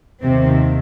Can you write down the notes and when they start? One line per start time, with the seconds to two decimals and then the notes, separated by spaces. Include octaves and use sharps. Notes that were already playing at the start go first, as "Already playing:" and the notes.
0.22 D#2 C3 D#3 C4